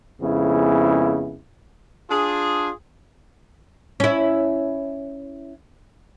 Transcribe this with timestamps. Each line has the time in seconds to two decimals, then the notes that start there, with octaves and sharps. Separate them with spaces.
0.22 F2 C#3 G#3 B3 E4
2.10 D4 F4 G#4
4.00 C#4 E4